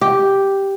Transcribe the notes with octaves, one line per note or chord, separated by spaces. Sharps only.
G4